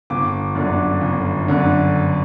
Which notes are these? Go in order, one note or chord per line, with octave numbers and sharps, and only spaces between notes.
G1 D6
F#2 D3
G1
F#2 D3